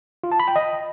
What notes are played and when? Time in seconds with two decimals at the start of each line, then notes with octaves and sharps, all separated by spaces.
0.24 F4
0.32 A5
0.40 B5
0.48 G5
0.56 D#5